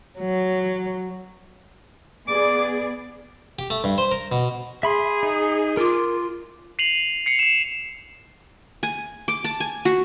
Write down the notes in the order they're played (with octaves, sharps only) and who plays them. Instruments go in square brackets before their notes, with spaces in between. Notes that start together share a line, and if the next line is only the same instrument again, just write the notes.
[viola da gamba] F#3
[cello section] B3 G#4 D5 [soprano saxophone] D6
[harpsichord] G4
A3
G2
C5
A#4
B2
[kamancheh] G#4 [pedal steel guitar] E5 B5 C6
[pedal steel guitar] D#4
[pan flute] F4 [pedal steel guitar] A#4 D6
[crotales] C7 D#7 F7 F#7
C7 C#7 F7
C7 E7
[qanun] G#5
D6
A5
G#5
F#4